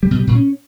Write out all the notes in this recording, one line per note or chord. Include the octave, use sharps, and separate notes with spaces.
G3
B2
G3
A#2
C#4